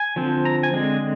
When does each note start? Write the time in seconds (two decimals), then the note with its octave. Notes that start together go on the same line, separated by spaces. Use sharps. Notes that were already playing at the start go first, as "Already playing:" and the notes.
Already playing: G#5
0.16 D3 F3 C4
0.45 A#5
0.63 G#5
0.73 D3 G#3 C4